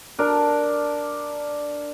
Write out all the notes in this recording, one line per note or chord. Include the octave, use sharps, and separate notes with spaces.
D4 A#4